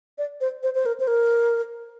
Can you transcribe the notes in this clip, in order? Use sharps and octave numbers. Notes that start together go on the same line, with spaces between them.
D5
C5
C5
C5
A#4
C5
A#4